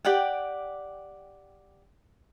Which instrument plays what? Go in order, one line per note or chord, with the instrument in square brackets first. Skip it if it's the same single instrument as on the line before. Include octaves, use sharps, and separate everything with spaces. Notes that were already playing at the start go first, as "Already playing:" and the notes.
[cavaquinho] G4 D5 F#5 G5